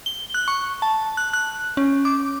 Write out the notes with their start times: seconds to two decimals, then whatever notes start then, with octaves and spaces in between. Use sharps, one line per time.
0.06 G7
0.34 F#6
0.48 C#6
0.82 A5
1.17 F#6
1.33 F#6
1.77 C#4
2.05 D6